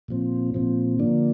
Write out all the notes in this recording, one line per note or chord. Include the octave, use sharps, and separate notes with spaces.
A#2 F3 C4
A#2 F3 C4
D3 F3 A#3 D4